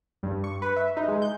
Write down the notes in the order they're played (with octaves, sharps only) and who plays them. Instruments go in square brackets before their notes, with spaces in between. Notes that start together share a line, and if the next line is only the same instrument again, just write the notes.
[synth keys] G2
C#6
B4
E5
D#4
G#3
G6